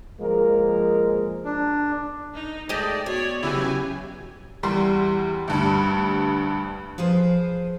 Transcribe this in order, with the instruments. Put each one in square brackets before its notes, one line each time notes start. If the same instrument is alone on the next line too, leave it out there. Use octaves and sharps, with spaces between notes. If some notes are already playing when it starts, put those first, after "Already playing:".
[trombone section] F3 G#3 A#3 A#4
[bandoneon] D4
[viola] D#4
[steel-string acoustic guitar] G#3 A3 [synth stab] G4 D#5 [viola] D5
[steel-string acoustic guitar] B2 [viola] C#5 D5
[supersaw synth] C#3 F#3 G4 [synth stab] E3 E4 [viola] G#5
[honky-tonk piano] E2 G3 C6
D2 G2
[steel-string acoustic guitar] F3 G#4 B4 C5